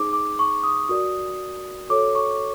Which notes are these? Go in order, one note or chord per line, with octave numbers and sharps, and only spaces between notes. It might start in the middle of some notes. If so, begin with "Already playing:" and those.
Already playing: D#4 G#4 C5 D6
D6
C#6
D#6
F#4 A#4 D5 D#6
F#4 A4 C#5 D6
C#6